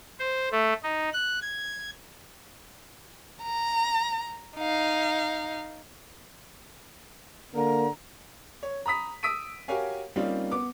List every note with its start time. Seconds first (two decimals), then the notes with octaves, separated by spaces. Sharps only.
0.20 C5
0.52 A3
0.83 D#4
1.13 F#6
1.42 G#6
3.43 A#5
4.57 D#4 F5
7.55 D3 A#3 A#5
8.63 C#5
8.86 A#5 B5 D#6 B6
9.23 D#6 E6 B6 D7 D#7
9.68 F#4 G4 A#4 C#5 F5 G#5
10.16 G3 A#3 C4 C#4 D#4 F4
10.51 B3 D6